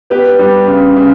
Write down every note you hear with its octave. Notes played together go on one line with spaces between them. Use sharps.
B3 G4 B4
G3
C#3
C#3